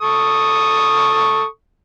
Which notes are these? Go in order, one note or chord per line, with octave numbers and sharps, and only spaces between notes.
A4 C#6 D#6